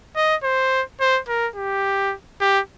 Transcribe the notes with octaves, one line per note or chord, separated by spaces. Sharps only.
D#5
C5
C5
A#4
G4
G4